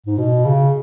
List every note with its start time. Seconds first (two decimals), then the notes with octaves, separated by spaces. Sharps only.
0.06 G#2
0.18 B2
0.45 C#3